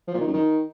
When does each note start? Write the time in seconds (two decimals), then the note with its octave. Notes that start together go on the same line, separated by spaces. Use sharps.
0.07 F3
0.14 A#2
0.20 D#3
0.27 F#2
0.33 D#3